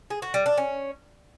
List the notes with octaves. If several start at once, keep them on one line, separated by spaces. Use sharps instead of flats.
G#4
F#4
G3
D4
C#4